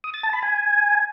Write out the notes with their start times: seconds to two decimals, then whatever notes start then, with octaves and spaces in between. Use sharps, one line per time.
0.04 D#6
0.14 A6
0.23 A5
0.33 B5
0.43 G#5